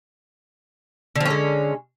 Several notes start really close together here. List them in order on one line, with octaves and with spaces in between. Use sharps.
D3 F3 C#4 G#3